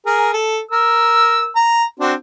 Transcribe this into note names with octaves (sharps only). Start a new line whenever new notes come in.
G#4 A#4
A4
A#4 E6
A#5
C4 D4 F#4